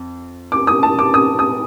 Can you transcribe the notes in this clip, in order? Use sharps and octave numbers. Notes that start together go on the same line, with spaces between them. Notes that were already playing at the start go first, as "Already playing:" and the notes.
Already playing: F2
D6
D#6
A5
D6
D#6
D#6